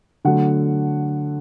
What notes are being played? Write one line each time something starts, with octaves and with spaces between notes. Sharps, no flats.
D3 F#3 A3 F#5